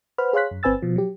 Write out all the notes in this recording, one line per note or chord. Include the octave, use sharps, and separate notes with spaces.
B4 C5 F#5 B5 F6
G#4 C#5 F5 C6 F#6 B6
F#2
G1 C4 B4 G#5 E6 A6
B2 F3
F#3 G4